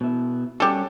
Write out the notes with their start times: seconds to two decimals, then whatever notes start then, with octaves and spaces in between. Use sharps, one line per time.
0.01 B2 E4
0.60 G3 C#4 F#4 G4 A4